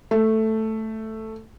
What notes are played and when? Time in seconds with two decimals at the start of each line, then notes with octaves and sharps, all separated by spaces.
0.11 A3